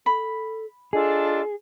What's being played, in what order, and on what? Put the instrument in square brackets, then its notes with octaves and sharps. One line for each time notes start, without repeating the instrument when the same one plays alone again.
[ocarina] A4 [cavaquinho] B5
[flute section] D4 F4 A4 [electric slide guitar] G#4 [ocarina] D#5